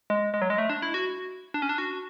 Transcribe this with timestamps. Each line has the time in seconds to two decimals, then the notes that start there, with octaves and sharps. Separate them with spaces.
0.10 G#3
0.34 G#3
0.42 F#3
0.50 G#3
0.58 A3
0.70 D4
0.82 E4
0.94 F#4
1.54 D4
1.62 C#4
1.69 D4
1.78 F#4